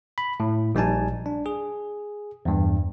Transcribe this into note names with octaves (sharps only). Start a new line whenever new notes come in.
B5
A2
A#1 G3 D#4 G#5 A5
D4
G#4
E2 G2